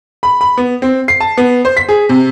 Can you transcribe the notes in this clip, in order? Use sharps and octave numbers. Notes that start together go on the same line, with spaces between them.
B5
B5
B3
C4
C7
A5
B3
C5
B6
G#4
C3